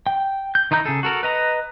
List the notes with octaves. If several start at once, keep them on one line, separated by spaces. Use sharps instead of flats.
G5
G6
D#3 D#4 E4 A#5 G6
C#3 G#4 A4
F#4 A4 A#4
B4 D#5 A#5